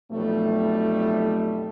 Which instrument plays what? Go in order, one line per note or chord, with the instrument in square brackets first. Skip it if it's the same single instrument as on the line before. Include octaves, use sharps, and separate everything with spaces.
[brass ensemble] B1 F2 G3 A3